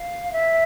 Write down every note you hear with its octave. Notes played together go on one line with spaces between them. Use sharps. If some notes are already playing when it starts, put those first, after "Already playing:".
Already playing: F5
E5